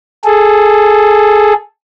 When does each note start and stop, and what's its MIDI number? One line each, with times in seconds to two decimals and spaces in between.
0.25 1.54 68
0.25 1.54 69